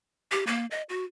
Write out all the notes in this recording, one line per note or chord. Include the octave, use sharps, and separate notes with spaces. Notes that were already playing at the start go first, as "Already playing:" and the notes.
G4
A#3
D#5
F#4